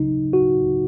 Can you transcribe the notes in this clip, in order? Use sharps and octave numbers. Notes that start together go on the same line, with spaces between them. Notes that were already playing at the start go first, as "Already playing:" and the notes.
Already playing: C#3 F#3 D#4
F#4